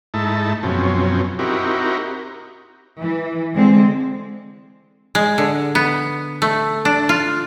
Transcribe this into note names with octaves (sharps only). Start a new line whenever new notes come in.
G#2 A3 D#4 E4 A5
F#2 B2 F3 C4 C#4
C4 D#4 E4 F#4 G4 A#4
E3
D3 G#3 C4
G#3
D3
B3
A3
D4
F4